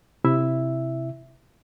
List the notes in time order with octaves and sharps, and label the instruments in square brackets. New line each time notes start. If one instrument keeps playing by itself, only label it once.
[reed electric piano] C3 E4 E5